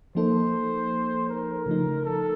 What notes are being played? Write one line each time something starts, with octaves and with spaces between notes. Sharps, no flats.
F3 A#3 D#4 A4 C5
A#4
C#3 F3 A3 D#4
A4